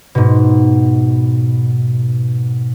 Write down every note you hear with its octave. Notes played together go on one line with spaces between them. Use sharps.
G#2 B2